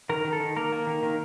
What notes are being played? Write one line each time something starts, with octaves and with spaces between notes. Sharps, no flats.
D#3 A#4
D#3
A4
D#3
A#3 A#4
A#3
D#3
D#3